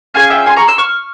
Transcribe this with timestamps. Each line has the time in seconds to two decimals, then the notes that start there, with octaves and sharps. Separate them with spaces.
0.14 C#4 F4 G#4 F5 G#5
0.30 E5 G5
0.46 G#5 C6
0.56 A#5 C#6
0.67 C6 E6
0.78 C#6 F6